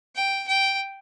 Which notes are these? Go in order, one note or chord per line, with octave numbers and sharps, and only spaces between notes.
G5
G5